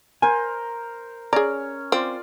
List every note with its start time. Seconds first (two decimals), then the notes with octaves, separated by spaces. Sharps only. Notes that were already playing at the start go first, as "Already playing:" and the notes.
0.22 A#4 C5 G#5
1.33 C#4 G#4 D5 A#5
1.92 C4 F4 D5